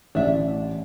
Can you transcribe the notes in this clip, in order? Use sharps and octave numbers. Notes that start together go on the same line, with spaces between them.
A1 D4 E5